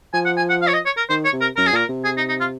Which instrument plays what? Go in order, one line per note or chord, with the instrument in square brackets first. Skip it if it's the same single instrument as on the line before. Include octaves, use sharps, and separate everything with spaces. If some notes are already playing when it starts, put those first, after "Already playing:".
[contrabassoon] F3 [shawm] G#5
[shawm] F#5
G#5
F#5
F5
C#5
D#5
C#5
A#4
[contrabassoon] D#3 [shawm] C5
[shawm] C#5
[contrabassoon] C3
[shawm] A#4
[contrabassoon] F#2 [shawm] A#4
[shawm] G#4
[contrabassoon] A#2 [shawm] A#4
[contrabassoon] C3
[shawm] G#4
D#4
D#4
F4